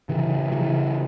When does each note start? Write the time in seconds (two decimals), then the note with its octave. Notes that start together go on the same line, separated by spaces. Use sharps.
0.09 C#3 E3
0.52 C#3 E3